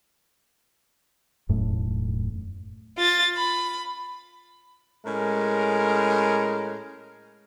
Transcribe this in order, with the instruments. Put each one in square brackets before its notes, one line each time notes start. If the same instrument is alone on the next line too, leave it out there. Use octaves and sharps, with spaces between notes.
[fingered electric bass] E1 F#2 A2
[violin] F4 A6
B5
[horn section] A2 G#3 C#4 A#4